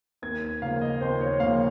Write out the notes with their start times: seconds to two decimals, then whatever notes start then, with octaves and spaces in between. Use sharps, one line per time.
0.22 D#2 G#6
0.62 C#3 F3 A#3 F5
0.81 D#5
1.01 D#2 C5
1.21 C#5
1.40 C#3 F3 A#3 F5